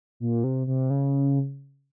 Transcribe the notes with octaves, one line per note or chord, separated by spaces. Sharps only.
A#2
C3
C3
C#3